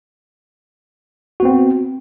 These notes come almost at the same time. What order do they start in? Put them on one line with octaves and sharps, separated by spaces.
F#4 B3 C4